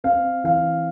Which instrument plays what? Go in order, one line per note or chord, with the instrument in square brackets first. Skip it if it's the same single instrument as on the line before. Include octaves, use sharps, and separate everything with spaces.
[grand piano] C4 F5
E3 F5